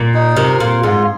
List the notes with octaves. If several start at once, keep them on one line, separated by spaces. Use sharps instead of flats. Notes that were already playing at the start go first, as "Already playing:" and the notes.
Already playing: A#2
D#4
C3 A#4
A#2 F4
G#2 F4